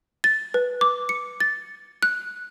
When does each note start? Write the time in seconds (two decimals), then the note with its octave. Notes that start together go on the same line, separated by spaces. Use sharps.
0.24 A6
0.54 B4
0.81 D6
1.09 C#7
1.40 A6
2.03 F#6